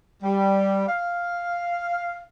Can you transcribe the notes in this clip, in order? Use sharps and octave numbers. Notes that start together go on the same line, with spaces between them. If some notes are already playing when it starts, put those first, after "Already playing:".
G3
F5